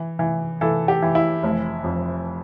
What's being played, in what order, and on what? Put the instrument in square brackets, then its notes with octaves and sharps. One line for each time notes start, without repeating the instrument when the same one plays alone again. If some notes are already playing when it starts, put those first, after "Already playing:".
Already playing: [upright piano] E3
E3
E3 A4
G4
E3
E4
F1
F2